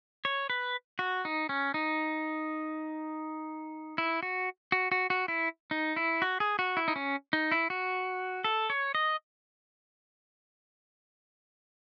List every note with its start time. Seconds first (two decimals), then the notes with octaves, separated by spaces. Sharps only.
0.25 C#5
0.50 B4
0.99 F#4
1.25 D#4
1.49 C#4
1.74 D#4
3.98 E4
4.23 F#4
4.72 F#4
4.92 F#4
5.10 F#4
5.28 E4
5.71 D#4
5.96 E4
6.22 F#4
6.40 G#4
6.59 F#4
6.77 E4
6.88 D#4
6.96 C#4
7.33 D#4
7.52 E4
7.70 F#4
8.44 A4
8.70 C#5
8.95 D#5